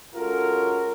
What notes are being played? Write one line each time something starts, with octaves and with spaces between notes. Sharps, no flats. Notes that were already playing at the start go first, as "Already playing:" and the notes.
G#3 C#4 F4 F#4 A4 A#4